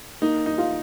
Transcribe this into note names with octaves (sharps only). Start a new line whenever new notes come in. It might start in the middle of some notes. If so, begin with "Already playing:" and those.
A#3 D#4
D#4
F4